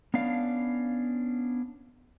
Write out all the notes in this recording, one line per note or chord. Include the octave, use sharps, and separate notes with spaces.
B3 C#4 D4 F5